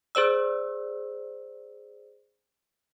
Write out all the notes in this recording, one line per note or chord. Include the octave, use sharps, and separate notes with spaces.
G#4 C5 D5 E6